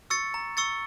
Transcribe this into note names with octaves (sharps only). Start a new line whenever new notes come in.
C#6 E6 A6 C#7
A#5
C#6 E6 A6 C#7